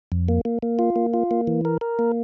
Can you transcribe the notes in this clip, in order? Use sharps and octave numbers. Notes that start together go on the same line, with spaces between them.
F2
A#3
A#3
A#3
F4
A#3
F4
A#3
E3
A#4
A#4
A#3